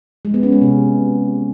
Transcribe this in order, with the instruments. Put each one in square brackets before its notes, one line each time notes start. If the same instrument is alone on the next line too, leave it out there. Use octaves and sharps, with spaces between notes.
[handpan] G#3
B3
C#4
G#3
C3